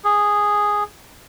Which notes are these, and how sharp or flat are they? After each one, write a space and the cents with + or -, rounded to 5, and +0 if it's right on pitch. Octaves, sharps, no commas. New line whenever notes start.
G#4 -5